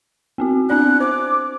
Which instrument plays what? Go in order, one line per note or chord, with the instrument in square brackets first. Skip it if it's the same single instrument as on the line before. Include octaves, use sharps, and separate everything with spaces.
[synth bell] B3 C4 F#4
[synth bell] C4 D4 D5 [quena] F#6
[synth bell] C5 [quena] D6